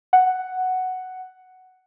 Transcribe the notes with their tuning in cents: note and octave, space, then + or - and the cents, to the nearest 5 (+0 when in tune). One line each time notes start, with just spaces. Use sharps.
F#5 +5